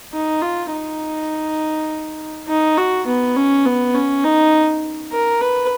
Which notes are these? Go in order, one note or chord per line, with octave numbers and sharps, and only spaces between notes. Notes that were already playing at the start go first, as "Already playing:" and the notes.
D#4
F4
D#4
D#4
F#4
B3
C#4
B3
C#4
D#4
A#4
B4